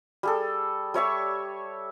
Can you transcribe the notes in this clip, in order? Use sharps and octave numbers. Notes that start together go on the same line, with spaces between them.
G3 G#4 A4
G3 C#5 E5 C#6